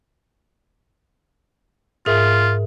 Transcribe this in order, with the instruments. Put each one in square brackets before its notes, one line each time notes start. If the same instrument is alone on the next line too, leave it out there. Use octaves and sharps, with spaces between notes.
[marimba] G#2 [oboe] F4 [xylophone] G#4 A#4 E5